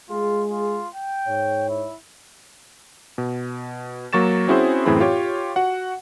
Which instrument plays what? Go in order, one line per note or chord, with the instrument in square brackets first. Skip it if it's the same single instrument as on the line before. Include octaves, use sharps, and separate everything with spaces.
[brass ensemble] G#3 G#4 [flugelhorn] F4
[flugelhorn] F4
G5
[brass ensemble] G#2 C#5
[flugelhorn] E4
[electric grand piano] B2
F#3 A#3 C#6 A6 E7
C4 C#4 E4 F#4 G#4 C5
F#2 A2 E3 C4 G#4 B5
F4 G4 C#5
F#4 F#5